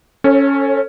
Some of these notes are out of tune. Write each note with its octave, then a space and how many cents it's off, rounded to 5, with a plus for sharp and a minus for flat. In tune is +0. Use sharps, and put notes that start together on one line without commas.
C#4 +0 A4 +15 C#5 -35